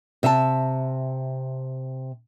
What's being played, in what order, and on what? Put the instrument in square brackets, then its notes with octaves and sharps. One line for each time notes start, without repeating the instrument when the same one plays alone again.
[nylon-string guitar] C3 E5 F5 A5